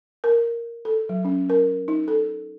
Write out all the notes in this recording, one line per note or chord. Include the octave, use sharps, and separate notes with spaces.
A#4
A4
F#3
C#4
A#4
D#4
A4